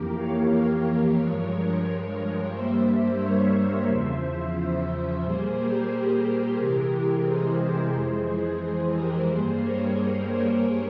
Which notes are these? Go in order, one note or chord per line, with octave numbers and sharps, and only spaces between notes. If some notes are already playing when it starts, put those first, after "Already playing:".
Already playing: F2 E3 A#3 G4 A#4
C#5 F5
A#4 C#5
G2 F3 G#3
G2 G3 A#3 C5 E5
A#4 C#5
E2 C#3 F3 C5 E5
C5 E5
C5 E5
A#2 G3 A#3 G#4 C5
G4 A#4
C3 E3 G#3
G#4 C5
G#4 C5
F2 E3 G#3 G#4 C5
G#4 C5
G4 A#4
G2 G3 A#3 G#4 C5
A#4 C#5
G#4 C5
A#4 C#5